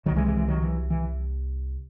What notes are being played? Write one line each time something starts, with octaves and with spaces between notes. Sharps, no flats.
C2 C3 D#3 F#3
E3 G#3
E3 G#3
E3
D#3 F#3
E3
E3